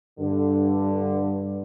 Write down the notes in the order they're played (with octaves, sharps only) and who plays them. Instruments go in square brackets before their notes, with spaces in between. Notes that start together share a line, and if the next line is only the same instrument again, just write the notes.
[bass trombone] G2 [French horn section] D3